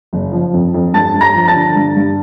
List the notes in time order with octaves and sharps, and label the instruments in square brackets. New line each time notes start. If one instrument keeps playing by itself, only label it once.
[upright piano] F#1
F3
F2
F2
G2 A5 A6
G2
A#5 A#6
F3
A5 A6
D3
G2
G2